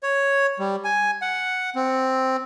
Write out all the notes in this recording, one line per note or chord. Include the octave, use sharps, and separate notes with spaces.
C#5
G3
G#5
F#5
C4